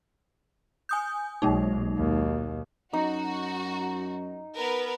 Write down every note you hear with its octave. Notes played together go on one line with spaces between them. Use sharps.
G#5 D#6 G6
B1 G#3 A#3 D#4
D#2 B2
F#2 D#4 F#4
B3 A#4 B4